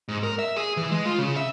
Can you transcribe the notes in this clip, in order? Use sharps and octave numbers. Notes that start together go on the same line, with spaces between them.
G#2
A#4
E5
G#4
E3
G#3
F4
C#3
E5